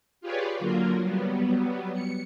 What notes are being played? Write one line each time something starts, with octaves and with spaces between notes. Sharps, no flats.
F4 G4 G#4 B4 C#5 D5
D3 F#3 A#3 F4 A#4
F#3 G3 B3
C#7